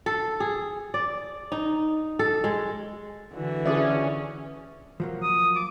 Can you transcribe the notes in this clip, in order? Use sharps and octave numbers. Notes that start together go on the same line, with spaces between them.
A4
G#4
D5
D#4
A4
G#3
D3 E3 F#4
C#4 G#4 D5 E5
F3 F#3 A#3
D#6
D6